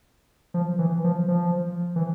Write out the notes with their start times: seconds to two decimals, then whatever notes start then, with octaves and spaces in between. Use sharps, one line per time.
0.54 F3
0.79 E3
1.04 F3
1.28 F3
1.96 E3